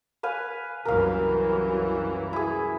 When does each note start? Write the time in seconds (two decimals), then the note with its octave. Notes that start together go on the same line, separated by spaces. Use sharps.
0.23 B4 F5 G#5
0.85 C2 F#2 E3 A#4 F5
2.33 E4 G#4